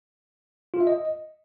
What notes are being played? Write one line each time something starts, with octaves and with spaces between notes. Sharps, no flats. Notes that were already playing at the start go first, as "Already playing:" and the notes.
F4
E5
D#5